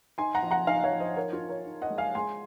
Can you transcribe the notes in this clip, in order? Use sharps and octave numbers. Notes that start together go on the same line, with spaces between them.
D#4 G#5 C6
F#5 A#5
F3
F#5 A#5
D#4 F5 G#5
C#5 F5
F3
C5 D#5
D#4 A#4 C#5
F4
D#4
A#4 C#5
D#4
D#5 F#5
G#3
F5 G#5
G#3 G#5 C6